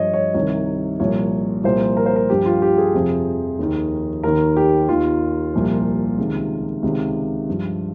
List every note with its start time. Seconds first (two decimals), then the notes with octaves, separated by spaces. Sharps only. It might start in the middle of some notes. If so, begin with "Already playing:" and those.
Already playing: G2 F3 C#5 D#5
0.14 C#5
0.34 C2 C3 D#3 C#5
1.00 C2 A#2 F3 C#5
1.64 C2 A#2 F3 C5
1.97 A#4
2.06 C5
2.16 A#4
2.29 G2 F3 G4
2.45 F4
2.62 G4
2.78 G#4
2.95 F2 C3 F3
3.59 D#2 D#3
4.23 D#2 D#3 A#4
4.57 G4
4.88 D#2 D#3 F4
5.54 C2 A#2 F3
6.18 C#2 C3 D#3
6.83 C#2 C3 D#3
7.48 G2 F3